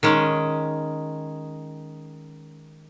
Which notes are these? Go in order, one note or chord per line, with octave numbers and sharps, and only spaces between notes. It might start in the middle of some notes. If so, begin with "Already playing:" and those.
D#3 G#3 C#4